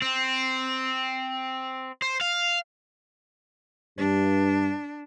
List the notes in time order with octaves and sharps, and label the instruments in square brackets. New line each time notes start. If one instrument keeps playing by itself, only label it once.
[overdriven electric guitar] C4
C5
F5
[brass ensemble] G2 [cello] D4